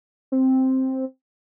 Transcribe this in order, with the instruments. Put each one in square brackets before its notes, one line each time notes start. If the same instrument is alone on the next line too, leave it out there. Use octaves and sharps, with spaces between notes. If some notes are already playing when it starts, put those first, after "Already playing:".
[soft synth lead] C4